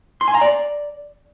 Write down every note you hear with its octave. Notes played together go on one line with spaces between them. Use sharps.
C6
G#5
A#5
D5